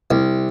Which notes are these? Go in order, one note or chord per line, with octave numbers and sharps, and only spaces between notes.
C2